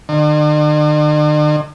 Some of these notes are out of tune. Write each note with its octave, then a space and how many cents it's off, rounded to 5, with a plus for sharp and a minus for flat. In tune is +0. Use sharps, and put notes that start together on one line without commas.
D3 +45